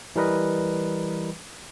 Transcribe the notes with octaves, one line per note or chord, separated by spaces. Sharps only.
E3 G3 A#4 B4 D#5